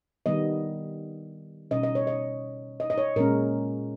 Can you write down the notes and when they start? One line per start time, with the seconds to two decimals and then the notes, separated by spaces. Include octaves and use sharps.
0.26 D#3 G3 B3 D#5
1.71 B2 G3 C#4 D#5
1.83 D#5
1.95 C#5
2.07 D#5
2.80 D#5
2.90 D#5
2.98 C#5
3.16 A#2 G#3 C#4 A#4